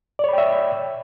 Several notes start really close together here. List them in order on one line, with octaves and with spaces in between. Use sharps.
D5 C#5 B5 G5 E5